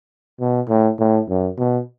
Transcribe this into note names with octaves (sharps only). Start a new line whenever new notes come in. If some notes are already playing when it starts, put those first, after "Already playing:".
B2
A2
A2
F#2
B2